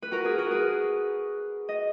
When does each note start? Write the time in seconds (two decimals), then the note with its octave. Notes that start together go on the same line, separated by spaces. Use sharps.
0.02 B4
0.11 F#4 A#4
0.25 G#4 B4
0.38 F#4 A#4
0.51 G#4 B4
1.69 D#5